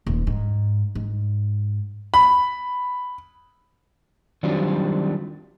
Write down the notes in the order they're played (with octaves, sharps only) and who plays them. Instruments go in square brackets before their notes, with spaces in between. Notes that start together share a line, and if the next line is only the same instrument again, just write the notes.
[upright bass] D#1
G#2
G#2
[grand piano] B5
[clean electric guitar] D#3 F#3 G3 C4 D4 F4